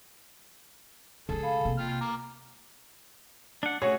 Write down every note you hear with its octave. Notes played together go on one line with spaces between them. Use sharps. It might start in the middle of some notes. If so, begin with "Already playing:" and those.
C#3 G#3 G#4 A4
F5 B5
C3 A#3
F4 G5 F6
A#5 D6 F6
D4 F#5
A3 F#4 G#4 C#5